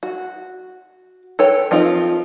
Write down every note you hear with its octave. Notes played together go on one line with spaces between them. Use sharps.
F#4
A4 B4 C#5 G5
F3 C4 D#4 F4